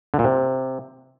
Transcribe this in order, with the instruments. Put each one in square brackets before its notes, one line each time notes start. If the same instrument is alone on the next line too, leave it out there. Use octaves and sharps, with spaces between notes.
[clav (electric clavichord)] D3
A#2
C3